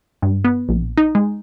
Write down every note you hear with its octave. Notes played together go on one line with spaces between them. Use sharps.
G2
B3
A#1
D#4
G#3